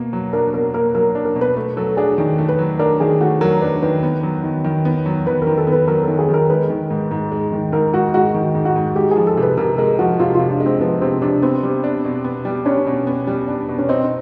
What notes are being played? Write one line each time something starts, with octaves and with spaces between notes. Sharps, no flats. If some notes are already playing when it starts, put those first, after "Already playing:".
Already playing: B2 A#3
F#3
D4 A#4
B2 A#4
A#3 A#4
F#3 A#4
D4
A#4
B2
B4
A3
F#3 A4
D4 G#4
D#3
A3
B4
F#3
D4 A#4
D#3 G#4
A3 F#4
F#3 A#4
D4 B4
D#3 B4
B3
F#3
D#3
D#3
B3
F#3
D#3 B4
D#3 A#4
A4
B3
B4
F#3 A#4
D#3 A4
G#4
D#3
A#4
G#3 B4
D#3
G#2
G#2
G#3
D#3
G#2 A#4
G#2 F#4
G#3 F#4
D#3
G#2
F#4
G#2
G#3 G4
F3 G#4
A4
C3
B4
C3 A#4
G#3 A#4
F3 F#4
C3 F4
C3 F4
D4
G#3
C4
F3 B3
C3 C4
C3 D4
B3 C4
G3
D4
B2
B3
G3
C#4 D4
B2
B3
G3
D4
B2
C#4
C4 D#4